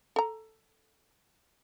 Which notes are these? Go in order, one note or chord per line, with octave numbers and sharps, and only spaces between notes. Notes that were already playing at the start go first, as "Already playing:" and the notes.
A4 A#5